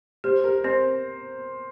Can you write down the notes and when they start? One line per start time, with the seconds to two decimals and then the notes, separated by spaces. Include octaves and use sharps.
0.24 G4 C5
0.44 G4 A#4
0.64 C4 C5